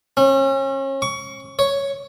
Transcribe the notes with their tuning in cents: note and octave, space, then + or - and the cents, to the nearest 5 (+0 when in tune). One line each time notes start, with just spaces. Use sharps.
C#4 -35
C#6 +25
C#5 +0